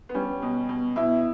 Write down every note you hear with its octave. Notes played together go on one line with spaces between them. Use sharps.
B3
G3 C#4
B2
B2
B2 E4